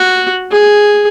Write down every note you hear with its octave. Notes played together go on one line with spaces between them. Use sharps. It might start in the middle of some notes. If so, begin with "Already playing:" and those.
Already playing: F#4
G#4